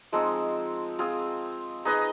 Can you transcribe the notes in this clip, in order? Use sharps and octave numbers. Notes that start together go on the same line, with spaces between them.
F3 G#3 C4 D#4
C4 F4 G#4
D#4 G#4 B4 D#5